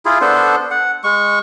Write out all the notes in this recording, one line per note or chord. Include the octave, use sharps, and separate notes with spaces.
E4 F4 G#4
B3 D4 A4 C5
F#5
G#3 C#6